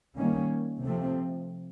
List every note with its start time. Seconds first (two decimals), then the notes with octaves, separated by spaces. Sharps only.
0.16 D#3 G3 A#3 C#4
0.84 C3 F3 A3 C4